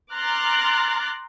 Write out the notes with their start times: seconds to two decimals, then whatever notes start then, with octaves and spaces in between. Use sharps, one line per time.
0.14 A#5 C6 D6 F6 F#6 A6